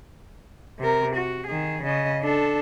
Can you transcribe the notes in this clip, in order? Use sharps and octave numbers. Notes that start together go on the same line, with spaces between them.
C3 A#4
F#4
D#3 G#4
C#3 D#5
D4 A4